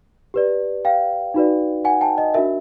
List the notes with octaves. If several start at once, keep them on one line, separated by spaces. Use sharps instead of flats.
G4 B4 D5
F5 G5
D#4 F#4 B4 D5
F#5 G#5
G5 A5
D#5
D4 F#4 A#4 E5